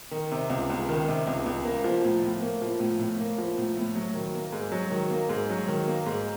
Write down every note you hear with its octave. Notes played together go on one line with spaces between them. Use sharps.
D#3
C3
C#2
C#2
D#3
C3
C#2
C#2
A#3
F3
A2
A2
A#3
F3
A2
A2
A#3
F3
A2
A2
F#3
D#3
A#3
G#2
F#3
D#3
A#3
G#2
F#3
D#3
A#3
G#2